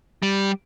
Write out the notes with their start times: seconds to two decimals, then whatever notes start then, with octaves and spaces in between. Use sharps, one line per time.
0.23 G3